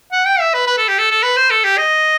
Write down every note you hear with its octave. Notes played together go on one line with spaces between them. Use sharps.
F#5
G5
E5
B4
B4
A4
G4
A4
A4
B4
C5
A4
G4
D#5